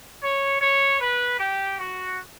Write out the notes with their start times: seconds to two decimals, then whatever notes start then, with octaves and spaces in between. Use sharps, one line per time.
0.23 C#5
0.61 C#5
1.00 B4
1.40 G4
1.79 F#4